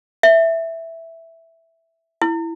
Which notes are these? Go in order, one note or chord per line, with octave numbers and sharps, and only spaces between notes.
E5
E4